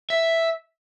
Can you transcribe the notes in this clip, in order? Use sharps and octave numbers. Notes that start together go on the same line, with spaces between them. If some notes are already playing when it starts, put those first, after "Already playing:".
E5